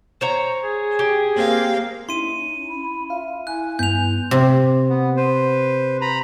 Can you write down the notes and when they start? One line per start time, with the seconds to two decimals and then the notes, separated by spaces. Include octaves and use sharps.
0.21 C5 C#5 A#5
0.63 G#4
0.99 G4
1.35 A#3 C4 F5
2.09 C#4 D#4 E4 C6 D#7
2.68 B5
3.10 F4 E5 F5
3.47 E4 G#5 F#6
3.79 G2 B3 G6 F7
4.31 C3
4.89 B3
5.17 B4 C5
6.01 A#5 B5